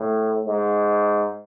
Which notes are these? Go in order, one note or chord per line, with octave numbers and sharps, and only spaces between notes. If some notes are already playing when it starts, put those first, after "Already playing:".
Already playing: A2
G#2